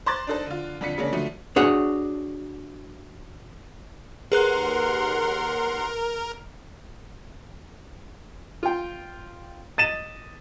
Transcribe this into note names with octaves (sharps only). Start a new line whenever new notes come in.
C5 A#5 C6 D6 F#6 A6
D4 D#4 A4 C5
D3 F4
F2 D3 D4 F4 B6 C#7
C#3 G#3 A#3 C#4 D4
D3 F3 F#3 A3
D4 F#4 G#4 C#5 F#5
D#2 G#4 A#4 B4 F#5 C6 F#6
F4 G5
D#5 A6 D#7 E7